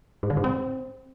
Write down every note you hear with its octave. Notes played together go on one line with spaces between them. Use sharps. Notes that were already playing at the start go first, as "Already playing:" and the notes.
G#2
D3
G#2
C4